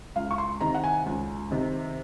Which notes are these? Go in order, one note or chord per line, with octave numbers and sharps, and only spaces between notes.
C#2 F5
C#6
C6
C3 D#3 A#5
F#5
G#5
C#2
C3 D#3